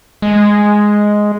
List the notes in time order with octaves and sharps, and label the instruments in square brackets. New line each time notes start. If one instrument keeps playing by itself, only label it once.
[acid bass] G#3